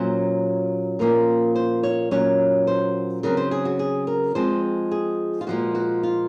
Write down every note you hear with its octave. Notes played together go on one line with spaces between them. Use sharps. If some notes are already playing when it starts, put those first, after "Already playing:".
Already playing: A#2 F#3 C#4 C5
A#2 F3 A#3 C#4 A#4
C5
C#5
A#2 F#3 C#4 C#5
C5
C#3 F#3 C4 A#4
C5
G#4
F#4
G#4
A#4
F3 G#3 C4 C5
G#4
F4
A#2 F3 G#3 F#4
F#4
F4